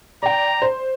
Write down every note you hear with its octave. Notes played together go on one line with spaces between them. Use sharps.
D5 G5 A#5
C5